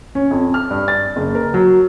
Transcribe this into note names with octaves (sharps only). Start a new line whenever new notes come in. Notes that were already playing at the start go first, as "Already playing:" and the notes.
C#4
F2
F6
G2
A6
F#1
A#4
F#3